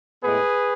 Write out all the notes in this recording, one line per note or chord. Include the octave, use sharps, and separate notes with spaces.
A2 G#3 B3 G#4 B4